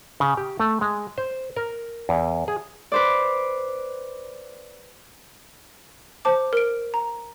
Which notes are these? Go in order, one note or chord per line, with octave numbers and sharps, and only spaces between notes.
C#3
G4
A3
G#3
C5
A#4
E2
G#4
B4 C5 D5
C5 A5 D6
A#4 D7
A#5